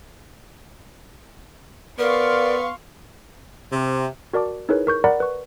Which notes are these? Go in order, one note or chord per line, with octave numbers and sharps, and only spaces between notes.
B3 A#4 D5 F5 C6 C#6
C3
F#4 A#4 D5 A5 D6
D#4 E4 G#4 A#4 B4 C#5
A#4 C#6 G6
A#4 D5 F#5 A#5 B5
B4 C#6